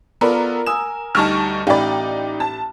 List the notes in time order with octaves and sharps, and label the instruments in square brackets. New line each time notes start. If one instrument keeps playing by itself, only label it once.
[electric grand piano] B3 A4 [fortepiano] F4 D5 B5 [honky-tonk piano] A#4
[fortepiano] G#5 D#6 E6 [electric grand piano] E7
[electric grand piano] D2 G3 D#4 [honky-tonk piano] A5 C#6 F6
[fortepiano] A1 B5 [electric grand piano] D#4 [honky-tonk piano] D5 G5
[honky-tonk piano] A5